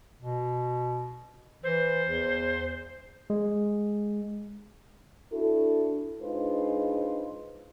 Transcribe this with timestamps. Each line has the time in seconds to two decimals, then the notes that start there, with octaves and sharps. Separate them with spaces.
0.22 B2
1.64 E3 C5
2.09 E2
3.30 G#3
5.33 D4 E4 F#4 A4
6.22 G#3 D4 D#4 F4 B4 C5